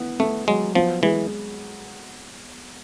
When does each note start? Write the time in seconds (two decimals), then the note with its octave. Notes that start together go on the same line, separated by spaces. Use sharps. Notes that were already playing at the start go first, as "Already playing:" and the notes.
Already playing: B3 E4
0.20 A3 B3
0.48 F#3 G#3
0.75 F3 B3
1.03 E3 G#3